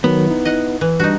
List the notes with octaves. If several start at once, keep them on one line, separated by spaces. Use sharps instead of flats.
D#3 F#3 B3
D#4 E4
D#5 F#5
E3
G3 D4 D#4 F#4